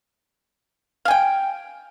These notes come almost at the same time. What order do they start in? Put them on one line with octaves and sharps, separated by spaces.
F5 G#5 G5